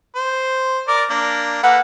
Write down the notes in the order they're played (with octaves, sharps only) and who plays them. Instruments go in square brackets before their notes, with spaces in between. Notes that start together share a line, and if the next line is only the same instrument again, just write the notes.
[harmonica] C5
A#4 D5 D6
A#3 D4
[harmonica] A#3 A4 B4 [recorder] F#5